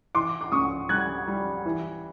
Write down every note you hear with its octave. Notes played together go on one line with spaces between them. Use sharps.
E3 C6 D6
D6
C#2 C#6 D#6
G3 F#6 G#6
G3
E3